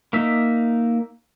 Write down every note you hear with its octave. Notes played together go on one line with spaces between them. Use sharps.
A#3 D#4 E5